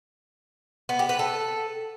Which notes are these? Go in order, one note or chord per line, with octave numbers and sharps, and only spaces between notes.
B3
G4
B4
A4